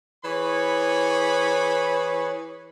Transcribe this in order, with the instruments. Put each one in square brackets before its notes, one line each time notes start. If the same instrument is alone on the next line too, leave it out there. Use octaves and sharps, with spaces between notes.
[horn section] E3 G#4 C#5 B5